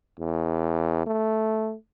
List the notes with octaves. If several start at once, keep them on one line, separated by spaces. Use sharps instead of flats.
E2
A3